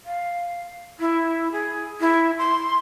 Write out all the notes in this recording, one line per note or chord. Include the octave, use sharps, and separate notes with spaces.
F5
E4
G#4
E4
C6